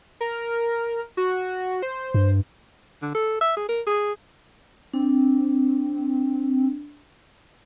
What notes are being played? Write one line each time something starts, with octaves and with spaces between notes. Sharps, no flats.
A#4
F#4
C5
G2
D3
A4
E5
G#4
A#4
G#4
C4 D4